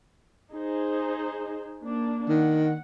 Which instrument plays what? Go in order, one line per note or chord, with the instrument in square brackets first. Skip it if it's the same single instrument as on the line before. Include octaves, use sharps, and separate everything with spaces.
[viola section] D#4 G#4 C5
A#3 D4
[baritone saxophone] D#3 [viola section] F#5